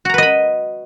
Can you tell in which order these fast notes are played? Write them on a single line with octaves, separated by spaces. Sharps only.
F#4 A#5 B4 D#5 B5